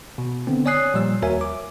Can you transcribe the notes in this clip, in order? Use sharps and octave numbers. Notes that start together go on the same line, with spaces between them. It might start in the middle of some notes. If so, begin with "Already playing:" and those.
B2
D3 B3 C4
C#5 D5 G#5 D#6 F#6 C7
A#2 F3 G3 E6
D#2 F#4 A#4 C#5 E5 G#5
D6